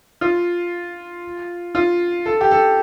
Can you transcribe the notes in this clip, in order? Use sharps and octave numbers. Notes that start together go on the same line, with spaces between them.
F4
F4
A4
G4
A4